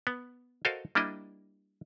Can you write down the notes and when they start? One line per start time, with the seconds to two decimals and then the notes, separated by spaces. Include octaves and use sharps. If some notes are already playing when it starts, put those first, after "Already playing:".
0.07 B3
0.65 F#4 A4 A#4 C5 D#5 F5
0.95 G3 A#3 D4 E4 D#5